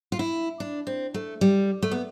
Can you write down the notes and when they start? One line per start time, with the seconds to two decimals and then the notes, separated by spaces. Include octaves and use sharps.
0.12 F4
0.19 E4
0.60 D4
0.87 C4
1.14 A3
1.41 G3
1.82 A3
1.91 B3